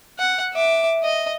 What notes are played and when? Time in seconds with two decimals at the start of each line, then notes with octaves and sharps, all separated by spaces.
0.19 F#5
0.54 E5 D6
1.04 D#5